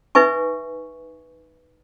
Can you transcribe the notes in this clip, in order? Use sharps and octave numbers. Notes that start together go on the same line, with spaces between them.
D#4 B4 E5 G#5 C#6